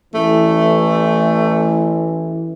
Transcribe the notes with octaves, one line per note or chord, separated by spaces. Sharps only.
A1 E3 A3